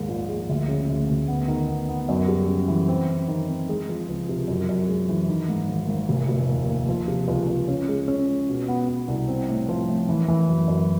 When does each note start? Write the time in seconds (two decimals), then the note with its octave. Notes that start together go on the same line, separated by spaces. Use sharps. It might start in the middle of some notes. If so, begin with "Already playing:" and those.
Already playing: D#2 G#2 G#3
0.08 A#1
0.29 G#3
0.49 D2
0.68 C#3
0.89 D2
1.09 D2
1.28 B3
1.48 D#3
1.68 B3
1.89 B3
2.09 F#2
2.28 G3
2.48 C#3
2.68 E3
2.88 C4
3.08 C4
3.28 D#3
3.48 C4
3.69 G#3
3.89 F3
4.08 C#2
4.29 C3
4.48 F#2
4.69 F#2
4.88 G#3
5.09 E3
5.28 D#3
5.49 G#2
5.69 G#1
5.88 G#1
6.09 F1
6.29 F1
6.49 D#2
6.69 D#2
6.89 F3
7.08 C3
7.28 C#2
7.48 C#2
7.68 C#4
7.88 G#3
8.08 C#4
8.28 G#3
8.49 B2
8.68 B3
8.88 B3
9.08 C2
9.28 C4
9.49 A2
9.69 F3
9.88 A2
10.09 E3
10.28 E3
10.48 F#2
10.68 F#2